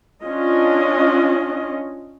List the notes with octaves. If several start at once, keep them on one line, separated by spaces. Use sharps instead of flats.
C#4 D4 F4 D#5